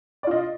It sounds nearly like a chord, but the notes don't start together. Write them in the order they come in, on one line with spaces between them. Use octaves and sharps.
D5 F4 D#5